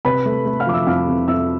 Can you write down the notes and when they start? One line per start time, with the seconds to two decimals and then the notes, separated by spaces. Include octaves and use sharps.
0.05 C3 B4 B5
0.26 A3
0.46 A3
0.60 F5 F6
0.67 F3 D6
0.74 E5 E6
0.87 F2 F5 F6
1.08 C3
1.28 F2 E5 E6